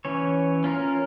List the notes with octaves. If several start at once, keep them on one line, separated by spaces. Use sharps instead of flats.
E3 C#4 C#5
C#4 F4 A#4